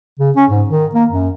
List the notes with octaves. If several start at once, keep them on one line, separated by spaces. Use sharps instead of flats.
C#3
C#4
G#2
D#3
A#3
F#2